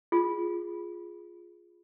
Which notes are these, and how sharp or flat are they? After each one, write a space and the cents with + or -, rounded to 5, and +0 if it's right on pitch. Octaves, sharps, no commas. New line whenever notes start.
F4 +0 G#4 +0